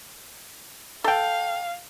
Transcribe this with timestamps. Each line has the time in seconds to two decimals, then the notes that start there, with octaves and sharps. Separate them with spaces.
1.04 A4 F5 G5